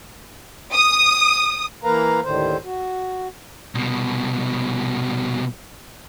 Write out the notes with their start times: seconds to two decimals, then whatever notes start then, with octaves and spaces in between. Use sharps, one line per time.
0.73 D#6
1.84 E3 A#3 A#4 B4 F5 A#5
2.23 D#2 A2 D3 D#3 C5
2.64 F#4
3.75 C2 B2